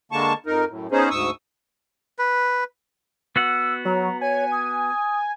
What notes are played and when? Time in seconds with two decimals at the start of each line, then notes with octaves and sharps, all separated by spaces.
0.12 D3 G#3 A#3 A5 C#6
0.46 F2 D#4 A#4
0.68 F#2 A2
0.92 B3 C#4 D#4 G#4 C5
1.10 D2 G#2 C#6 D#6 E6
2.19 B4
3.36 B3 F#4 F#5 E6
3.85 F#3 A#5
4.21 C#5 G#5
4.52 D#6